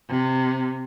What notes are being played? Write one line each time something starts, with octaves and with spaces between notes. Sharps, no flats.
C3